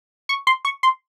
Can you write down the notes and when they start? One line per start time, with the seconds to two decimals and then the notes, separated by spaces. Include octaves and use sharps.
0.29 C#6
0.47 C6
0.65 C#6
0.83 C6